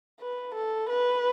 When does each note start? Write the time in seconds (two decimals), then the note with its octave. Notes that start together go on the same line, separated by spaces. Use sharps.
0.21 B4
0.55 A4
0.90 B4